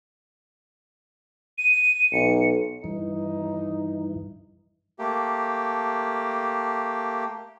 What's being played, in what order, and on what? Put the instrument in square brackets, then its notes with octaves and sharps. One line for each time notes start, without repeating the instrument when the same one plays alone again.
[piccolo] D#7
[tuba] B1 [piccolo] C#7
[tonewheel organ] G2 E3 [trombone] D#4
[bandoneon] A3 A#3 G4